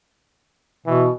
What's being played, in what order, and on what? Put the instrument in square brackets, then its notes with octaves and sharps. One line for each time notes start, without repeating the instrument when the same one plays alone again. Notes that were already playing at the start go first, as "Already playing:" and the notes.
[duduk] B2 [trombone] E3